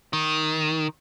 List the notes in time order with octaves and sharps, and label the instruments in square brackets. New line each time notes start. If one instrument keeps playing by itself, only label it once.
[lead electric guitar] D#3